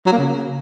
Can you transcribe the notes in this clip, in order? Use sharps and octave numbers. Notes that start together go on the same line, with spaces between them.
F#3
A#3
C#3